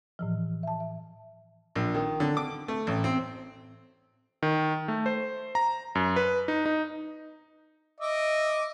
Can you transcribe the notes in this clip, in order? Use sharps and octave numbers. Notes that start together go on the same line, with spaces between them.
A2 E3 F3
E5 A5
E5
A#1
D#3
D3
D6
A3
A1
C4
D#3
A3
C5
A#5
F#2
B4
D#4
D#4
D#5 E5 D6